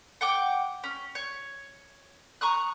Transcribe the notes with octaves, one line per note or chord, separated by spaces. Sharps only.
F#5 G5 D6
C#4
C#5
A#5 C#6 D#6 F#6